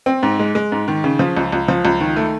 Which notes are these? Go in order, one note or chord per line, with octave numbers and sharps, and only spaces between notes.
C4
G#2
G#3
G#3
G#2
D#3
C#3
F3
C#2
C#2
F3
C#2
D#3
A3